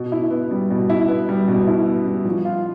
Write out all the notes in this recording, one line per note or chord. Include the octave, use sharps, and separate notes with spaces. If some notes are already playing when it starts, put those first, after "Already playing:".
Already playing: B2
E4
B3
G3
B2
E4
B3
G3
B2
E4
B3
G3
F3
F4